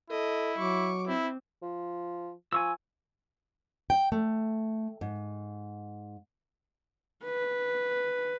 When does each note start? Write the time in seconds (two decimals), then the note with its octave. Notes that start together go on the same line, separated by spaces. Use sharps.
0.10 E4 A4 D#5
0.58 F#3 C#6 D6
1.07 C4 E4
1.62 F3
2.53 F3 G#5 C#6 E6
3.90 G5
4.12 A3
5.01 G#2
7.24 B4